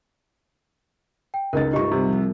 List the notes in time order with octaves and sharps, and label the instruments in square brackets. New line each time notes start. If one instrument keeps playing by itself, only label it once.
[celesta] G5
[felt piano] C#2 D#4 A6 [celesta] A#4
[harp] C2 G2 [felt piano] D#4 C#6 [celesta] F4 G4
[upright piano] C3 [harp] A4 F#5
[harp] F3